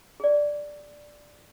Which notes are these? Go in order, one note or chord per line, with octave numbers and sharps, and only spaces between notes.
G#4 D5